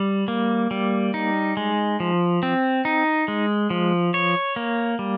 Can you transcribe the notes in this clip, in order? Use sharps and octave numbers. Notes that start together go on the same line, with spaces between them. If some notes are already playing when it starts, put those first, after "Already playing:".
Already playing: G3
A#3
G3
D#4
G#3
F3
C4
D#4
G#3
F3
C#5
A#3
G3